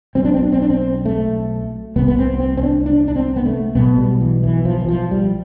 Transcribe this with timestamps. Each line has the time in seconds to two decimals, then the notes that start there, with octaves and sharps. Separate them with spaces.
0.15 B1 B2 C4
0.25 D4
0.34 C4
0.43 D4
0.52 C4
0.62 D4
0.70 C4
1.05 A3
1.96 C2 C3 B3
2.08 B3
2.19 C4
2.40 C4
2.57 C4
2.63 D4
2.86 D4
3.08 D4
3.16 C4
3.36 B3
3.46 A3
3.75 B1 B2 B3
3.98 G3
4.21 E3
4.43 E3
4.65 F3
4.81 E3
4.88 F3
5.11 G3